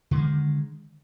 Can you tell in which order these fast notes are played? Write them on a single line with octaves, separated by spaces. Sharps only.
D3 G#3 D#3